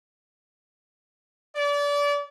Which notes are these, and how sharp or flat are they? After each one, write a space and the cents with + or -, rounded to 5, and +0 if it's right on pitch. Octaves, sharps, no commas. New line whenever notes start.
D5 -30